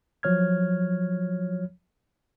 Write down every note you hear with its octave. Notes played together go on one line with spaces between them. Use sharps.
F3 F#3 C#5 F6 G#6